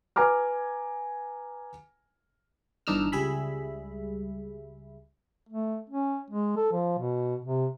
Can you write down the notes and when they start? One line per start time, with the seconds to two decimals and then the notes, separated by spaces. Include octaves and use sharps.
0.16 B4 G#5 A#5 D6 F6
2.87 G1 E3 D4 D#4 E6 F6
3.12 C#2 G3 G#4 E5 B5
5.49 A3
5.90 C#4
6.30 G#3
6.57 A4
6.73 F3
6.99 B2
7.45 C3